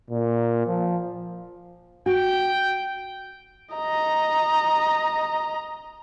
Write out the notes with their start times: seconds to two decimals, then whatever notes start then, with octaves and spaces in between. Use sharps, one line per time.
0.11 A#2
0.68 F3
2.06 F#4 G5
3.75 D#5 A#5